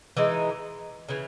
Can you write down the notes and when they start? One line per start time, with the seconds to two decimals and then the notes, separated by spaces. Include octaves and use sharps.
0.17 E3 G#3 D#4
1.09 C#3 E3